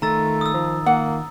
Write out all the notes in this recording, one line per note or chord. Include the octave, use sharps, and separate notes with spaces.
D#3 A3 F4 A#5 E6 A6
D#6 E6
F3
A#3 F#5